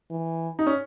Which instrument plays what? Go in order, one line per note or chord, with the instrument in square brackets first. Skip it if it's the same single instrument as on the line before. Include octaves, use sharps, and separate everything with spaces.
[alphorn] E3
[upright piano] D#4
C#4